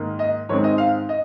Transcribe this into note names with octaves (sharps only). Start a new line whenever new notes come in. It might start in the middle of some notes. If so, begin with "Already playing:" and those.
Already playing: G#2 D#3 A#3
D#5
G#2 D#3 G#3 C4 C#5
D#5
F5
D#5